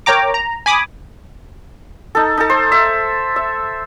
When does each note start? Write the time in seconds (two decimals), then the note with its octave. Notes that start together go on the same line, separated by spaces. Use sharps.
0.06 A#4 C#5 G5 A#5 D6
0.34 A#5
0.66 G#5 B5 D6 D#6
2.15 D#4 A4
2.38 D#4 A4
2.50 C5
2.72 E5
3.36 E5